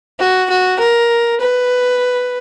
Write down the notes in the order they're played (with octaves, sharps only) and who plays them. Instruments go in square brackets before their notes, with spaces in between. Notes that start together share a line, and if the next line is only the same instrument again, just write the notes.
[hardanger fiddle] F#4
F#4
A#4
B4